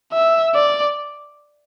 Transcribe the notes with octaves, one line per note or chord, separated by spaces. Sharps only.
E5
D5